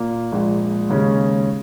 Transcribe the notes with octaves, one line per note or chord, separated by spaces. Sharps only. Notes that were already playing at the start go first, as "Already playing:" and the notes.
Already playing: A#2 A#3 F4
A#1 A#2 G#3
D#2 C#3 G#3 C#4